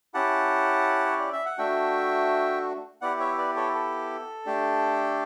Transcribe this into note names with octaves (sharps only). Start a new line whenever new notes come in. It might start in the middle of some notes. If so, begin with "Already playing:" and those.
C#4 E4 G4 F#5 A5
C#5
D5
E5
F#5
A3 D4 F#4 E5 G5
B3 E4 G4 D5 F#5
C#5 E5
B4 D5
A4 C#5
A4
A3 D4 G4